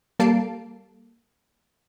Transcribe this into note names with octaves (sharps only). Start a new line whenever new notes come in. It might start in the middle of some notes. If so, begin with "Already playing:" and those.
G3 A#3 A4 A5 C7 D7